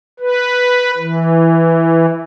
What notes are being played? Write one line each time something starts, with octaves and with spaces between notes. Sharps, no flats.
B4
E3